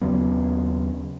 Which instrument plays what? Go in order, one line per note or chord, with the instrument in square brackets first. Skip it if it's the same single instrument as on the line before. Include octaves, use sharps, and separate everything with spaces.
[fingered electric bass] D#2 C#3 F#3 B3